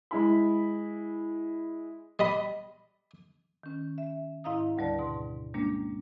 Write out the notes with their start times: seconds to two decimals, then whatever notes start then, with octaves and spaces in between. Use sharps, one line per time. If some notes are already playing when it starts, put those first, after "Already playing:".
0.11 G#3 E4 B5
2.19 G3 D#5 B5
3.63 D#3 C#4
3.98 E5
4.44 G#2 E4 D#5 F5 A#5 D#6
4.78 D2 D3 G3 B4 D5 A5
4.99 G#2 B2 C6
5.54 G3 G#3 A#3 C#4 D4